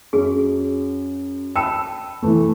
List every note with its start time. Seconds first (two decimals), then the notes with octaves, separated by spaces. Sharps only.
0.13 F#2 G#4
1.56 G5 A5 B5 E6
2.22 E3 A3